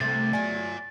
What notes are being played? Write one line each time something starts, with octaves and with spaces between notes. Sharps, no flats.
C2 C3 A3 A6
F#3 G#3 D5 G#5